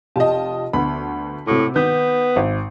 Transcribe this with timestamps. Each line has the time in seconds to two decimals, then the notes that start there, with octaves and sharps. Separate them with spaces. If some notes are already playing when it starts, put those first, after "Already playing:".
0.16 F1 F4 G4 D#5 A5
0.73 D2 B3 F#5 B5
1.47 A2 C3 F#4 D6
1.76 D#3 B3 G6
2.36 G#1